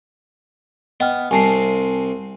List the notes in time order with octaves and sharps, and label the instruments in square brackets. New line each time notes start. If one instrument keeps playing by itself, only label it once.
[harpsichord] B3 [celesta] D#5 G5 F6
[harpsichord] C2 C3 [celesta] G#5 A5 C7